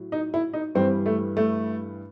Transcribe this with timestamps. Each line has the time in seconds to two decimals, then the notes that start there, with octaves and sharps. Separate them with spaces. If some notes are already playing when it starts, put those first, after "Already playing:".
Already playing: A2 F#3
0.12 D#4
0.34 E4
0.54 D#4
0.75 G2 E3 G3 C4
1.06 A3
1.37 A3